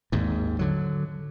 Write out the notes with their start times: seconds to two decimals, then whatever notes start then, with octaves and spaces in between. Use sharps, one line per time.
0.12 G#1 D#2 G#2
0.59 D3 F#3